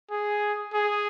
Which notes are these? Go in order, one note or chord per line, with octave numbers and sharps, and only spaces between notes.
G#4
G#4